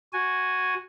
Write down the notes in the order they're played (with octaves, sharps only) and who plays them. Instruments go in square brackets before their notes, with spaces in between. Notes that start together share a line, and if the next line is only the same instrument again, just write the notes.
[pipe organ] F#4 G#5